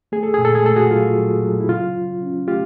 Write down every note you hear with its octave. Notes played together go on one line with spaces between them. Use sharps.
A3 G#4
A4
A#2 G#4
A4
G#4
A3 A4
F#4 G#4
F#3 F4
F#3
F#3
E4
C#3 F4
C#3
C#4
A3 F4 G4